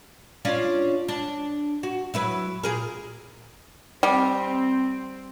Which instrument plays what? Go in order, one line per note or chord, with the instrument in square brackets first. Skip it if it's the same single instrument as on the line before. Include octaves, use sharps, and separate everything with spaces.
[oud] C#4 D4 F4
D4
F#4
F#3 E4 B4
A#2 G#4 A#4
[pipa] G3 [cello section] C4